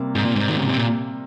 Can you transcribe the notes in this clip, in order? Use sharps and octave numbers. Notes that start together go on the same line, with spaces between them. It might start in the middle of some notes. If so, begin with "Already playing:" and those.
Already playing: C3 G3 A#3
G#2
A#2
G#2
D#3
C#3
C3
A#2